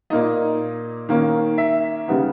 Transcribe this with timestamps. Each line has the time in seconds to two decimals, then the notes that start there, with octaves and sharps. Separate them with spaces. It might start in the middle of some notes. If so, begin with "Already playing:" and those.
0.10 A#2 A#3 D#4 D#5
1.09 D#3 A#3 C#4
1.58 E5
2.08 C#3 G3 B3 D#4